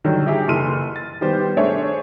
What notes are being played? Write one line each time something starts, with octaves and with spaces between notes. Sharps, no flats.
D3 D#3 F#3 G3
D#4 E4 G4 G#4
F#1 E3 A4 C6 F6 D#7
A6
D#3 G3 B3 G4 C5
A3 D4 G#4 C5 C#5 E5